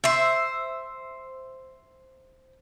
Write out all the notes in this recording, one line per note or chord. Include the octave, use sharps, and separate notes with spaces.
C5 E5